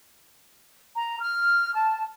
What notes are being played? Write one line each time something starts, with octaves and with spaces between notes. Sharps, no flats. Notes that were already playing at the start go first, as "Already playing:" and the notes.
A#5
F6
A5